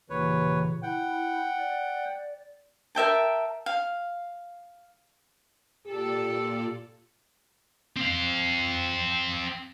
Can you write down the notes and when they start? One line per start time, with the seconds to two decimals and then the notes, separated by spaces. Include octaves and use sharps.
0.10 D#2 A#2 C#3 E3 B4 C#5
0.83 E4 F#5 G5
1.59 D5
2.95 A#4 E5 G5 A5
3.66 F5
5.86 A#2 F4 G4 A4 D5
7.97 C4 F5